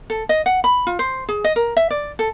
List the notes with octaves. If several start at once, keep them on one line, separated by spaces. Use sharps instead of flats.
A4
D#5
F#5
B5
F4
C5
G#4
D#5
A#4
E5
D5
A4